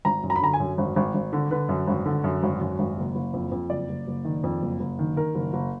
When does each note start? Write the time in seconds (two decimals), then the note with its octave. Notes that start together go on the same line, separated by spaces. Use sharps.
0.05 G#1 A#5
0.23 F#2
0.30 A#5
0.36 B5
0.41 D3 A#5
0.53 G#5
0.60 F#2
0.78 G#1
0.96 G#1
1.14 G#1
1.33 D3
1.51 D3 B4
1.69 F#2
1.88 G#1
2.06 D3
2.24 F#2
2.43 G#1
2.61 F#2
2.79 G#1
2.98 F#1
3.15 F#1
3.33 F2
3.51 F2
3.70 F#1 D5
3.89 F#1
4.07 F#1
4.25 D#3
4.43 F2
4.62 F#1
4.80 F#1
4.99 D#3
5.16 D#3 A#4
5.35 F#1
5.53 F#1